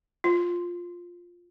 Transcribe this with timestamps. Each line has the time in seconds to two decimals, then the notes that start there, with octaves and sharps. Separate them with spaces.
0.24 F4